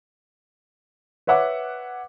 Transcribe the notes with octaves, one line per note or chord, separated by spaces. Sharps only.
B4 C#5 E5 F#5 D6